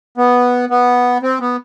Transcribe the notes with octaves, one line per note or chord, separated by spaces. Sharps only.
B3
B3
C4
B3